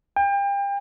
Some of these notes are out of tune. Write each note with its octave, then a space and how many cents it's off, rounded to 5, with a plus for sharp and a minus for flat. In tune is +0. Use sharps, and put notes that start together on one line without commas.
G5 +35